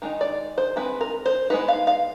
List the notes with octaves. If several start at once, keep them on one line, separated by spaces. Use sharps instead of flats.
D#3 G#3 D#4
D5
C5
D#3 G#3 C4 B4
A#4
C5
G#3 B3 D#4 B4
F5
F5